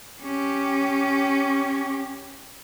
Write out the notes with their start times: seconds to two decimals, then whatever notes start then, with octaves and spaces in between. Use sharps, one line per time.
0.22 C#4 G4